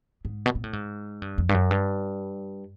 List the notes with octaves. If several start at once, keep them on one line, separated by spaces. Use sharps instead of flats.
G#2
B2
A#2
A2
G#2
G2
F2
G2
F#2
G2